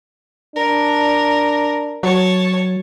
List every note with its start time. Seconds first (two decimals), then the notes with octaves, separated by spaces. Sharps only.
0.56 D4 A#4
2.03 F#3 C#5 A5